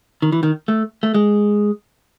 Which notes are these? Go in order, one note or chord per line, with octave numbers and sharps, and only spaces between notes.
D#3
E3
D#3
A3
A3
G#3